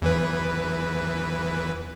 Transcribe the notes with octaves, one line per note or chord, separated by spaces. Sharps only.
E2 E3 B4